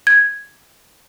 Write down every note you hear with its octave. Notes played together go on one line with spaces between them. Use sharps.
G#6